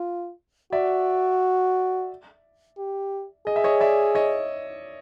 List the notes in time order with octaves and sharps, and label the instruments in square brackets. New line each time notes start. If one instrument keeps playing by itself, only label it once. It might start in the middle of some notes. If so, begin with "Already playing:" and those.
Already playing: [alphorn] F4
[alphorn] F#4 [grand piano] D5 E5
[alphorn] G4
[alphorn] G#4 [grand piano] D#5
[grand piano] E5
C#5 D#5
D5 E5
C#5 D#5